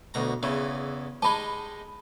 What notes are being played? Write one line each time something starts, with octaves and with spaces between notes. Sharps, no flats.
D2 B2 A#5
E2 C#3 E3
G#3 D#4 G4 A5 B5